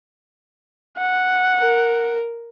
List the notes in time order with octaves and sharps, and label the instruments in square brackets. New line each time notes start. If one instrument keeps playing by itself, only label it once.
[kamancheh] F#5
[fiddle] A#4